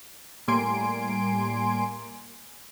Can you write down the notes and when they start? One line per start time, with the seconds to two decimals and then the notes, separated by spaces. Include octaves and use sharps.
0.48 A2 G3 A#3 G#5 C6 D7